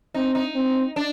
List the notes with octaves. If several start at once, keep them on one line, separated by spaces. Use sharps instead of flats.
C4 D#4
D#4
C4
D4